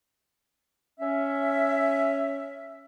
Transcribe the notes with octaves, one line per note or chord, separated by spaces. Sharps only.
C#4 E5